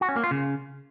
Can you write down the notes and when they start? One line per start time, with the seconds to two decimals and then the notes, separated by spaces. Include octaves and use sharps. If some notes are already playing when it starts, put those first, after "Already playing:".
0.01 F#4
0.09 C#4
0.16 A#3
0.24 F4
0.31 C#3